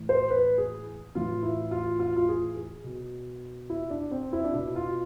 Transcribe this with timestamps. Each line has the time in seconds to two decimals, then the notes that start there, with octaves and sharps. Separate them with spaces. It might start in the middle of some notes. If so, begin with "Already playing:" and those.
Already playing: A2 E3
0.09 C5
0.30 B4
0.58 G#4
1.15 A2 E3 F4
1.43 E4
1.71 F4
1.99 F4
2.16 F4
2.28 G#4
2.56 G#4
2.84 B2
3.70 E4
3.90 D4
4.11 C4
4.33 E4
4.44 D4
4.54 B2 E4
4.76 F4